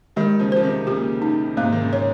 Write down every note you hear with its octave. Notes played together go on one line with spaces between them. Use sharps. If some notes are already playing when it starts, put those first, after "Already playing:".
D#3 G3 G#3
C#3 F3
F3 C5
C3 D#3
A#2 C#3 G4
D#4
G#2 C3 A#3
D#3
A#2 C#3
C#5